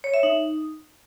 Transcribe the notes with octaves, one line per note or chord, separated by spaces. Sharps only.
C#5
E5
D#4